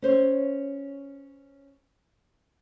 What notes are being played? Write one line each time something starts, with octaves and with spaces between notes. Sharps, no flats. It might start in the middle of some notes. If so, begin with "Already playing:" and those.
C#4 C5 C#5